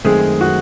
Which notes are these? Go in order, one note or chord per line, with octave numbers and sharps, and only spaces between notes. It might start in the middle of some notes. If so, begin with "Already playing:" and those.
F#2 D#3 G#3 A3 C4 G#4
F#4